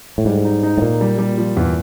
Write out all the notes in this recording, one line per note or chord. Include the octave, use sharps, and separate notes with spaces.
A2
G#2 G3
D#4
D#4
A2
A#2 A#3
G3
G3
F3
E2